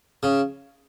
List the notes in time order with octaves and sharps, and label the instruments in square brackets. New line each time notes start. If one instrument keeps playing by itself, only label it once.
[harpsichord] C#3